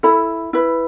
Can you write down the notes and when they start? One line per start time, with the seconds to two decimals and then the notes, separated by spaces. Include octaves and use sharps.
0.03 E4 A4 B5
0.53 E4 B4